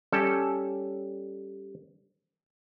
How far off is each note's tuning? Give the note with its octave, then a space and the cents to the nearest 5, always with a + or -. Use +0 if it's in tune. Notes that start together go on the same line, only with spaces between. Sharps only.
G3 +0 C#4 +0 A4 +0